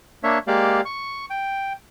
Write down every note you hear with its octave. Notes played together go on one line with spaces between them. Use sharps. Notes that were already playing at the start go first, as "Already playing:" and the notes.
A#3 D4 C#5 E5
G#3 A#3 G4 D5 F5
C#6
G5